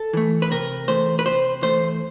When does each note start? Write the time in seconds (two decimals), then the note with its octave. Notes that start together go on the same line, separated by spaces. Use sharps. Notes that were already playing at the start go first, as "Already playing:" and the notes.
Already playing: A4
0.13 E3 A3
0.42 B4
0.51 C3 A#4
0.88 E3 A3 C5
1.19 B4
1.25 C3 C5
1.62 E3 A3 C5